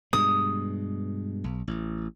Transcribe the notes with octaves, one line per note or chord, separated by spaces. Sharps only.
G2 B2 G#3 D#6
B1
A1